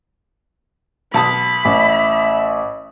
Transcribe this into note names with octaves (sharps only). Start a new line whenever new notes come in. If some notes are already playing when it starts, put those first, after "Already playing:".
B1 A5 B5 D#6
A1 E5